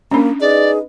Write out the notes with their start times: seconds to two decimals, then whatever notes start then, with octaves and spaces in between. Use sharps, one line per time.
0.11 A#3 C#4 D4
0.41 D#4 G#4 B4 D5 D#5